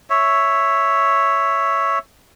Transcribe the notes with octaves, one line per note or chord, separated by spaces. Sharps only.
C#5 E5